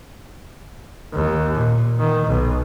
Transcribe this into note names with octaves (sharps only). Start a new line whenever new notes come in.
D#2
A#2
D#3
B1